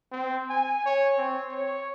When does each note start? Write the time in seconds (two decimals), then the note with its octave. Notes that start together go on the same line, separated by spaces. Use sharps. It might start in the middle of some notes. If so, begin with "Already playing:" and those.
0.12 C4
0.50 G#5
0.86 C#5
1.18 C4
1.52 C#5